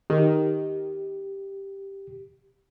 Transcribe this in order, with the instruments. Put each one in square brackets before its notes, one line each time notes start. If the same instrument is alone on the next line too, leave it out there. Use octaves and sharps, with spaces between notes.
[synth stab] D#3 [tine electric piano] G4